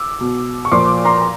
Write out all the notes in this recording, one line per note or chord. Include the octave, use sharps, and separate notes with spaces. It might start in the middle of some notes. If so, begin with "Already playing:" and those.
Already playing: D6 E6
B2
C#6
A#2 F3 C6 D6
A#5 C6
A#5